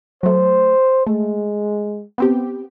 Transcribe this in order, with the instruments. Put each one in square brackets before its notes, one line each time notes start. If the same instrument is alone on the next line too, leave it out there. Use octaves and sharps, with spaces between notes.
[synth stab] F#3 A3 [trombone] C5
[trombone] G#3 [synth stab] A3
[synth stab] B3 C4 G4